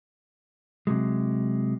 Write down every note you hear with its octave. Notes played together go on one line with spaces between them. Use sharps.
C3 F#3 G#3